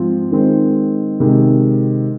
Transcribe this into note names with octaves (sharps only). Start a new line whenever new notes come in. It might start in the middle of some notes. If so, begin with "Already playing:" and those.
Already playing: G#2 F3 C4 F4
D#3 G#3 C4
C3 D#3 G#3